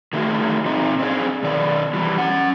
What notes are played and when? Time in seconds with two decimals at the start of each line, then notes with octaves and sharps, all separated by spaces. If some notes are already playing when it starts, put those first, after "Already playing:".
0.13 D#3 G3 A3 A#3 F#4 G#4
0.65 A#2 C4 D#4 D#5
0.99 C4 D4 G#4
1.43 B2 D#3 D5
1.93 E3 G3
2.18 C#4 F#5